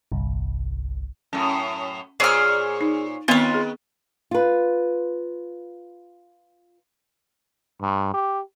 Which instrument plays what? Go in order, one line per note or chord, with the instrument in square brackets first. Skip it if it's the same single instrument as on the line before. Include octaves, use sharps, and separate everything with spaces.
[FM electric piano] G1 C2
[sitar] F#2 A2 [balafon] C#4
[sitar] A#2 C5 C#5 [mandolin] G#4 F6
[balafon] D#4
[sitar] D#3 B4 [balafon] B3 C4 F5 [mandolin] F4 C#5
[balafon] G#4
[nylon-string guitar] F4 B4
[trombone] G2
G4